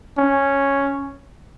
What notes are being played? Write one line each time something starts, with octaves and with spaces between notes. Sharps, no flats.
C#4